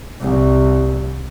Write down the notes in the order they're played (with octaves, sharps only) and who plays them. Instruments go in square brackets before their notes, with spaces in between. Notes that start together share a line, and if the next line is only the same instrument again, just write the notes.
[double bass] C2